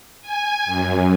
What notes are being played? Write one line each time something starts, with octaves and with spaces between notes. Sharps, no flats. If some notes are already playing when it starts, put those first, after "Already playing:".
G#5
F#2